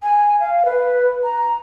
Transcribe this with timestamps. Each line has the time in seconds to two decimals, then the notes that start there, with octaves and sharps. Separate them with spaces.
0.03 G#5
0.40 F5
0.65 B4
1.24 A#5